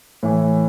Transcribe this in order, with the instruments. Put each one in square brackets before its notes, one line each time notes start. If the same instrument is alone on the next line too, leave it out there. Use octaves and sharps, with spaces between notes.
[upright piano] A2 E3